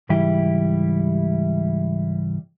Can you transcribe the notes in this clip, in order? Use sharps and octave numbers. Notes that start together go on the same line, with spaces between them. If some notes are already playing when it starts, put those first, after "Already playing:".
C#2 G#2 E3 G3 E4 G4